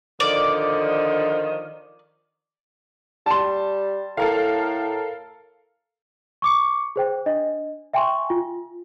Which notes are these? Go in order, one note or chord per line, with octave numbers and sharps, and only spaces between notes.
D3 D#3 F3 D5
G3 A5 C6
A2 A4 A#4 F5
C#6 D6 C#7
G#4 C5 G5
D4 D#5
E5 G5 G#5 C6 C#6
F4